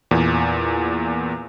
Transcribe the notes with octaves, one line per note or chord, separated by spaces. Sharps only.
E2 A#2